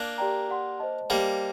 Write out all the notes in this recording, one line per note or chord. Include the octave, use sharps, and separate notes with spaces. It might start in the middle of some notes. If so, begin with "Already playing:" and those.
Already playing: A#3 D4
G4 A#4 D5 G5 A#5
G4 D5 F#5 C6
C5 D#5 A5
G3 A#3 G4 C5 D#5 A5